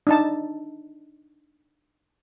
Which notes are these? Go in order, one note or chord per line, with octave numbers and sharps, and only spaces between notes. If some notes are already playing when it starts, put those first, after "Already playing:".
D4 D#4 A5